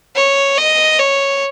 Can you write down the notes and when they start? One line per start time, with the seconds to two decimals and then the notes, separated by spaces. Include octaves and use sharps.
0.16 C#5
0.58 D#5
0.99 C#5